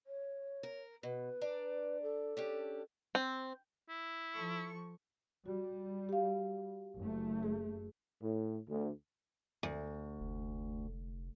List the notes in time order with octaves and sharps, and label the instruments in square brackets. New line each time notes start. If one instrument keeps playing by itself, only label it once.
[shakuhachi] C#5
[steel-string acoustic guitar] A#4
[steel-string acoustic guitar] B2 [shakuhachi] B4
[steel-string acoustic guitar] D4 D5 A#5
[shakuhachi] A4
[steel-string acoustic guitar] C#4 D4 G4
[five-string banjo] C4
[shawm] E4
[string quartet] F3 A4 C#6
[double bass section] G3 [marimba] F#4
[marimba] G4 F5
[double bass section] F#1 A3
[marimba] G#4
[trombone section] A2
D2
[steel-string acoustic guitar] D2
[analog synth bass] F1